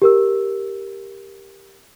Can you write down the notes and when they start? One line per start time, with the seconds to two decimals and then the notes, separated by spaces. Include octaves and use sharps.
0.02 G4 A#4 E6